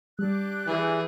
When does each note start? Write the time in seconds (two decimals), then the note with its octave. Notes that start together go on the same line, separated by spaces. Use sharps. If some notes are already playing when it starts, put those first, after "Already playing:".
0.19 G3 D4 G4 F#6
0.67 E3 G#4